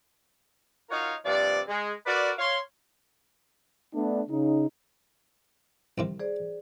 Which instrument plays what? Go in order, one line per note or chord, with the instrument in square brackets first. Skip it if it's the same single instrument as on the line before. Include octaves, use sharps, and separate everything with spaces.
[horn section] D#4 F4 F#4 A#4 C#5 F5
G2 C3 F3 D5
G#3
F#4 A#4 B4 D5
C#5 F5 C6
[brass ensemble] A3 B3 D4
C#3 D#4
[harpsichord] C2 C3 D#3
[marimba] G#4 C5 D5